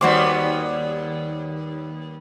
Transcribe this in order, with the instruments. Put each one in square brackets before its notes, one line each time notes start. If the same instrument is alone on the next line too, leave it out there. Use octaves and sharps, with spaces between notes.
[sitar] D#2 G3 B3 [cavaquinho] F#4 C5 D6